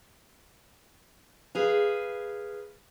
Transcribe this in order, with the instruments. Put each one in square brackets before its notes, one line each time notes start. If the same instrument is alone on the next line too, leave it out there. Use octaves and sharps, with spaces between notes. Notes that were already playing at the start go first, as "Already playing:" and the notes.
[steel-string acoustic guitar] G#4 B4 F5